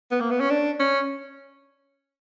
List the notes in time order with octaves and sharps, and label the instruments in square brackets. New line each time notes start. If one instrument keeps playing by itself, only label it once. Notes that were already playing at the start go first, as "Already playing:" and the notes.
[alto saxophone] B3
A#3
B3
C#4
D4
C#4